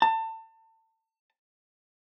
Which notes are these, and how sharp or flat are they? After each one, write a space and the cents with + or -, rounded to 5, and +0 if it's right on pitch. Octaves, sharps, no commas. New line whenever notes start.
A5 +30